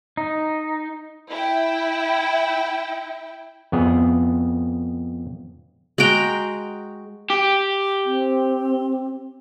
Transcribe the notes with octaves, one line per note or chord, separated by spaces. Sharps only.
D#4
E4 G5
F2 B3 G#4
G#3 F#4 G5 A#5
G4
C4